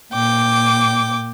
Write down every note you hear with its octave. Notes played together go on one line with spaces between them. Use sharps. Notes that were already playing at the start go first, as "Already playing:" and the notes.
A#2 G5 D6